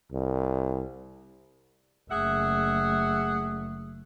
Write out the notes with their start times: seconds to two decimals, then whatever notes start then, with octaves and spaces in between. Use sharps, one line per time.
0.12 C2
2.11 F#1 A3 G#4 E5 F#5